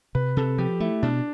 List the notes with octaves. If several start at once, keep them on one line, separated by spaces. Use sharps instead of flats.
C3 B4
C3 A4
F3 G4
A3 E4
B2 D4